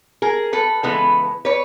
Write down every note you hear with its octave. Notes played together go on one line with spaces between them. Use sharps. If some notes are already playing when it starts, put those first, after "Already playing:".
G#4 A#4
A4 B4
C#3 E3 G#3 B3 A4 B4
B4 C#5